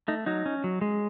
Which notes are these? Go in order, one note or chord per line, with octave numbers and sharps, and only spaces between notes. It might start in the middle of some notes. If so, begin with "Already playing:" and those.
A3 D#4
F#3 D#4
C#4
F#3
G#3